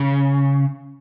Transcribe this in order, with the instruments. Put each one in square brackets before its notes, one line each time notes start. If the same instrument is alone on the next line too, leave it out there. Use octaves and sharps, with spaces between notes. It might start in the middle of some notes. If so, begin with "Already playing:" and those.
Already playing: [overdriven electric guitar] C#3